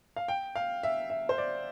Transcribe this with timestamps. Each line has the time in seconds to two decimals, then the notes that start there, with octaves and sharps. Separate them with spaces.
0.16 F5
0.28 G5
0.56 F5
0.83 E5
1.10 E5
1.29 C5
1.38 D5